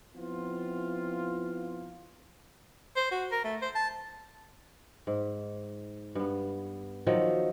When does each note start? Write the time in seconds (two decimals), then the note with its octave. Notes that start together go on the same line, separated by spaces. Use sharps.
0.15 F3 B3 C4 E4 F4
2.97 C5
3.11 F#4
3.32 A#4
3.44 A3
3.62 C5
3.75 A5
5.07 G#2
6.15 G2 B3
7.07 D#3 F3 F#3